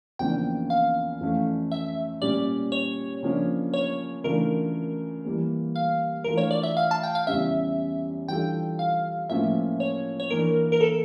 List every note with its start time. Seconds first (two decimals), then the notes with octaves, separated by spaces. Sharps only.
0.19 E2 C#3 F3 A#3 D4 G5
0.70 F5
1.21 F2 E3 A3 C#4
1.72 E5
2.22 A#2 G3 C#4 G4 D5
2.72 C#5
3.23 C#3 F3 A#3 D4
3.74 C#5
4.24 C#3 E3 A3 D4 F4 A#4
5.25 E3 G3 A#3
5.76 F5
6.24 E3 A3 D4 F4 A#4
6.38 C#5
6.51 D5
6.63 E5
6.77 F5
6.91 A5
7.03 G5
7.15 F5
7.27 E2 C#3 G3 C#4 E5
8.28 E3 G3 D4 F4 A4 G5
8.79 F5
9.29 A2 F3 A#3 C#4 F4 E5
9.80 C#5
10.20 C#5
10.30 E3 A#3 D4 A#4
10.72 A#4
10.81 A4